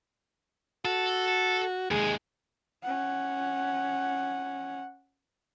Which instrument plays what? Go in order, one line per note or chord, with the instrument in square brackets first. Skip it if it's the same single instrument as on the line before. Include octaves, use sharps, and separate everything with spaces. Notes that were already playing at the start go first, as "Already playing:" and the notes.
[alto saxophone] F#4 [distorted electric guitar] A4
[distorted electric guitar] D#2 G#3 [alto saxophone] G#4
[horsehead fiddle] C#4 F#5